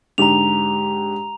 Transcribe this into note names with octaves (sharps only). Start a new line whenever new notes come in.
G#2 D3 G4 A#5 F7